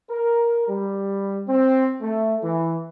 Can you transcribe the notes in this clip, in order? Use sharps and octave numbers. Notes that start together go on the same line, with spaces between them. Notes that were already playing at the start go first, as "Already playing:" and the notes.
A#4
G3
C4
A3
E3